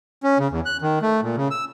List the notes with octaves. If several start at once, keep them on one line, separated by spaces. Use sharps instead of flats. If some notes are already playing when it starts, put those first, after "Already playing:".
C#4
C#3
E2
F#6
D#3
A3
A#2
C#3
E6